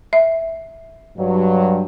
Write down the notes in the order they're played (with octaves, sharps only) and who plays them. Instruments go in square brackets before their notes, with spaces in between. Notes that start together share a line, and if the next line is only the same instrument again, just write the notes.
[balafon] E5
[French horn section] G2 F#3